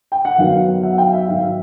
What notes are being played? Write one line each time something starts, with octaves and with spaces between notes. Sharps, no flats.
G5
F#5
F#2 D#3 F#3 B3 F5
E5 F#5
F5 G5
E5
G#2 D#3 F#3 F5
E5